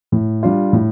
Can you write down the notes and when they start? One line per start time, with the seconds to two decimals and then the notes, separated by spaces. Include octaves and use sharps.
0.12 A2
0.43 G3 D4 F4
0.73 A2